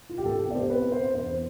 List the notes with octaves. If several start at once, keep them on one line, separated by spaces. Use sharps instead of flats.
F4
G4
A2 A4
G4
B3 D5
C5
C4 B4
C4 C5
E2 C5